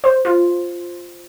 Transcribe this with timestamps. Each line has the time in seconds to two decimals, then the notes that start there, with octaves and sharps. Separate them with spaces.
0.04 C5
0.25 F4